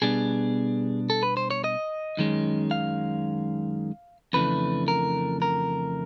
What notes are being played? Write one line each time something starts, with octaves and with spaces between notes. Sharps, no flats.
B2 G3 B3 D4 G#4
A4
B4
C5
C#5
D#5
F#2 D#3 G#3 C#4
F5
F2 C#3 E3 A3 D4 B4
A#4
A#4